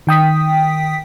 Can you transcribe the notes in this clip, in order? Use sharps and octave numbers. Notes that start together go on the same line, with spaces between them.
D#3 G5 D#6 B6